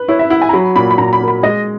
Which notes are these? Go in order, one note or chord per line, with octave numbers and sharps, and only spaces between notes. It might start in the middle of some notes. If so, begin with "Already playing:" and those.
Already playing: B4
E4 C#5
E5
E4 F#5
G#5
A#5
F#3 B5
A#2 B5
B5
A#2 A#5
B5
A#3
B5
G#3 D#5